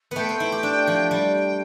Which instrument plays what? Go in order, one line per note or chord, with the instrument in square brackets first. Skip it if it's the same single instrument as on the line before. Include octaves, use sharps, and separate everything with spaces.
[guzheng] A3 B3 [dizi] G5
[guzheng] C4
E4
G4
D4
F3
[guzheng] G3 [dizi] G5